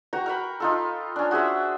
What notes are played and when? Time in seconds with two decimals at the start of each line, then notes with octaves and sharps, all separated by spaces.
0.13 F#4 G5 A#5 C#6
0.26 A#4 G5 B5
0.60 D#4 F4 A4
1.16 C#4 D4
1.31 F#4 G#4 C5 E5